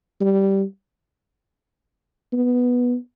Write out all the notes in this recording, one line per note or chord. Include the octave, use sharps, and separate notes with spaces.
G3
B3